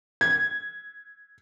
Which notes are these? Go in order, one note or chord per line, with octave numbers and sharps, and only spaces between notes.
G#6